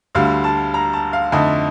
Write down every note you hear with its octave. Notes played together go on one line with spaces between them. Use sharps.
D2 D3 G3 F5
A5
A#5
A5
F5
F2 D3 A3 D#4 D#5